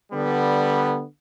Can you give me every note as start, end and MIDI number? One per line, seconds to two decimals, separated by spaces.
0.12 1.03 50
0.12 1.03 55
0.12 1.03 59